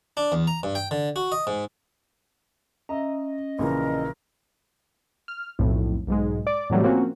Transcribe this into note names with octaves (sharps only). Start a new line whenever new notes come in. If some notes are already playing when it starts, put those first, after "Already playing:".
D4
E2
A#5
G2
G5
D3
F#4
D#5
G#2
C#4 D#5 E5 A#5
A#1 C#3 E3 A#4
F6
B1 F2 A2
B1 G#2 G#3
D5 D6
A2 C3 E3 F#3 G3 A3
F3 A#3 C4 C#4 F#4